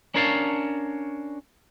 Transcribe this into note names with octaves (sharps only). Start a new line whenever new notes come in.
C#4 D4 A#4 C#5 F5 A5